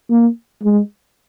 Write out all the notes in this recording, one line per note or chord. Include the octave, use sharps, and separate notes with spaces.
A#3
G#3